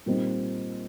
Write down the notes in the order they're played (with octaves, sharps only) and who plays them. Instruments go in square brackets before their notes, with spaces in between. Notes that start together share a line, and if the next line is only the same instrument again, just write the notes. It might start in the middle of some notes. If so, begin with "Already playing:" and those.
[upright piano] A#2 G3 C4 D#4